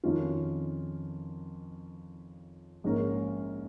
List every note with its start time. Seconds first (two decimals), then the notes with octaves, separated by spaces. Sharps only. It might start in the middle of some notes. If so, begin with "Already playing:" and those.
0.03 F2 D#3 C#4 F4
2.84 A#1 G#2 G#3 C#4 A#4